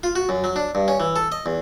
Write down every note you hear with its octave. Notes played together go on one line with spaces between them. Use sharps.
F4
F#4
F#2
F#3
D4
G2
C#4
E3
A4
D#5
E2